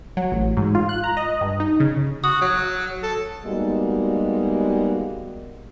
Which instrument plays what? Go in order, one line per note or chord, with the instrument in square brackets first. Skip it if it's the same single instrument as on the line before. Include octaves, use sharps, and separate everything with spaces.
[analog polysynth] F#3
A1
G#2
F4
F#6
A#5
D#5
G2
D#4
C#3
[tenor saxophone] F#4 [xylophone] D#6
[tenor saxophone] F#3
A4
[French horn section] G3 G#3 A#3 B3 D#4 F#4